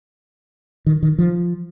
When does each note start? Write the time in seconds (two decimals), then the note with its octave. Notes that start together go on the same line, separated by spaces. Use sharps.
0.86 D#3
1.03 D#3
1.18 F3